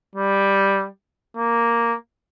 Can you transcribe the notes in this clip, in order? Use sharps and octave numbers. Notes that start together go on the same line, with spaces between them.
G3
A#3